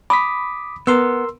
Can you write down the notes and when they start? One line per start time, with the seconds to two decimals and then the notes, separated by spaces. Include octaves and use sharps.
0.10 B5 D6 D#6 B6
0.87 B3 A#4 C6 E6